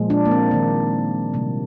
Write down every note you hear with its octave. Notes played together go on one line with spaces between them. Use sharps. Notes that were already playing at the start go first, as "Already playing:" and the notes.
Already playing: A#2 F3 G#3
D4
A#3
C4
D#3 A#3
C3 G3 A#3